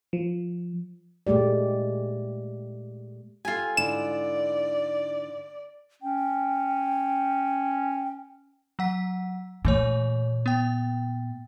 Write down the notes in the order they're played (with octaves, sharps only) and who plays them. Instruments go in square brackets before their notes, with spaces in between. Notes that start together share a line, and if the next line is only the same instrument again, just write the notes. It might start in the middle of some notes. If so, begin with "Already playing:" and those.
[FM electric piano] F3
[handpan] A#2 G#3 A3 G4 D5
[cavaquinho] F4 G#5 [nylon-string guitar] G4 A4
[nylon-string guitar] G#2 D3 E4 [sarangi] D5 [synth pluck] E7
[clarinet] C#4 [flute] G5
[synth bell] F#3 F#5 B6
[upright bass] A#2 [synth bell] E3 A3 C#5
[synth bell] B3 G5